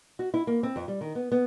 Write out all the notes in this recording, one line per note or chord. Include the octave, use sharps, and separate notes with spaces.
F#4
E4
A#3
C4
F2
G3
D#3
B3
B3